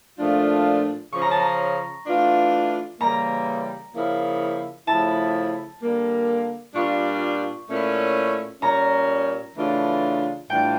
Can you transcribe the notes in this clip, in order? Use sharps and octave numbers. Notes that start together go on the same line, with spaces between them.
A#2 F3 A3 D4 F4
C#3 F3 C#4 C#6
A#5
A5
A#5
E3 A3 D4 F4
C#3 E3 G3 A#3 A#5
C#3 F3 A#3 E4
C#3 F3 A3 E4 A5
D3 G3 A#3
A#2 G3 D4 F4 C#6
A#2 A3 C#4 E4
A#2 G3 C#4 A#5
C#3 E3 A3 D4 F4
A2 E3 G3 D4 F4 G5